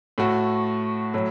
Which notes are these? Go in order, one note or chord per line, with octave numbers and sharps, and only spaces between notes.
A2 A3 F#4
A2 F#3